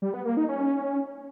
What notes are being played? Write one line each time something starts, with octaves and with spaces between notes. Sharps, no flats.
G3
B3
A#3
D#4
C#4